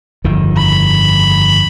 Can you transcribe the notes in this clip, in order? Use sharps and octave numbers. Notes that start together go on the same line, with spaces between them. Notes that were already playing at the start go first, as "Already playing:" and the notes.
G1 F2 D#3
B5